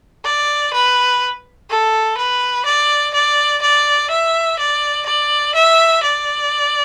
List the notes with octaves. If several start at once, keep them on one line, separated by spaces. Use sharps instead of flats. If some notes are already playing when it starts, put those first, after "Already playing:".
D5
B4
A4
B4
D5
D5
D5
E5
D5
D5
E5
D5